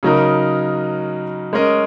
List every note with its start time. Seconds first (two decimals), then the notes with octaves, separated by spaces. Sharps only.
0.03 C#3 F#3 D#4 A#4
1.53 G#3 C#4 A#4 D#5